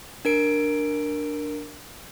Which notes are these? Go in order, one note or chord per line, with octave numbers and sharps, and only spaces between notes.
D4 A#4 D7